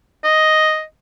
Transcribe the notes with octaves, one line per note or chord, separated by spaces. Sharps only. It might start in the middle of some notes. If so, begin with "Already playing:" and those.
D#5